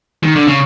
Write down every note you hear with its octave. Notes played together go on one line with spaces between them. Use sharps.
D#3
D3
C#3